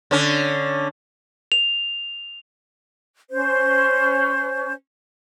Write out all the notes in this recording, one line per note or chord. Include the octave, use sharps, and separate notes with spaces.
D3 C#4
F7
C#4 C5